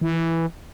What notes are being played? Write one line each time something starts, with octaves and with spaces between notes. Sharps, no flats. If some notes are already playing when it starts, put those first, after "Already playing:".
E3